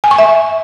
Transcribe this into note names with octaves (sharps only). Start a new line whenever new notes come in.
G#5
C#6
E5